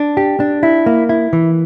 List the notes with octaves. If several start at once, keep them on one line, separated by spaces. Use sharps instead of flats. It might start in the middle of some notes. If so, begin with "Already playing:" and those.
Already playing: D4
G4
D4
E4
A#3
E4
E3